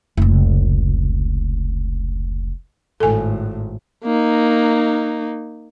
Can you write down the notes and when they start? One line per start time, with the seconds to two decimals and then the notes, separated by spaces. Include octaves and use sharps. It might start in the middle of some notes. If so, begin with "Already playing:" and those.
0.17 F1 C#2
3.00 G#1 A2 A4 G#5
4.05 A#3 D#4